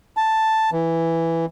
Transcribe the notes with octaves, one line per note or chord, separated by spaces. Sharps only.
A5
E3